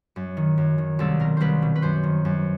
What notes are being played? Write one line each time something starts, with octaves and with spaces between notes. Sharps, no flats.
F#2
D#3
F#2
D#3
C2 A4
B2 A#4
C2 B4 C5
B2
B4
F#2 C5
D#3
F#2